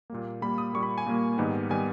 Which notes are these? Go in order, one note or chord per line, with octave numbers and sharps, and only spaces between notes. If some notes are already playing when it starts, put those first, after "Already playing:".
A#2 G3 A#3
A#2 G3 A#3 B5
D#6
A#2 G3 A#3 C#6
B5
G#5
A#2 G3 A#3
G#2 D#3 G3 B3
D#3 G3 B3 G#5